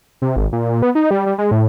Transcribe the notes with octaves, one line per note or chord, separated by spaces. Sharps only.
C3
G#1
A#2
B3
D#4
G3
G3
G#3
A2